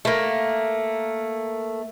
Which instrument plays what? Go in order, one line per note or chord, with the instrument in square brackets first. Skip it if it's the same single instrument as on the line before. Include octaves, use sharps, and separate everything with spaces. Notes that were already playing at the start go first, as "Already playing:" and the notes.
[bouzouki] A3 A#3